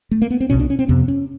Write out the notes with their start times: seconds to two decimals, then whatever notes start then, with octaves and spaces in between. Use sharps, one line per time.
0.11 A3
0.22 A#3
0.31 B3
0.40 C4
0.50 C2 B2 C#4
0.60 D4
0.70 C#4
0.79 C4
0.88 F2 C3 B3
1.08 C#4